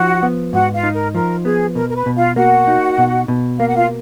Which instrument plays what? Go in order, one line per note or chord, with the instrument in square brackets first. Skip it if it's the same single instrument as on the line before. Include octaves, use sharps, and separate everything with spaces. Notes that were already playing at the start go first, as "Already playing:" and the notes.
Already playing: [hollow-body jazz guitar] F3 D#4 [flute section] F#4 F#5
[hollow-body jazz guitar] B3
[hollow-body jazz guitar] G#2 [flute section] F#4 F#5
[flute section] F4 F5
[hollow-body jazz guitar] D#4
[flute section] A#4
[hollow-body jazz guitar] F3 [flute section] A#4
[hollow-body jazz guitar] B3 [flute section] G#4
[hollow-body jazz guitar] B2 [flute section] A#4
[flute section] A#4
B4
[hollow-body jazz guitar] B2
[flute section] F4 F5
[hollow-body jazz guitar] A#3 [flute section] F#4 F#5
[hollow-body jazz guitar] D#4
B2
B2
[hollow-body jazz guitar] A#3 [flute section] F5
[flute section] F#5
F4 F5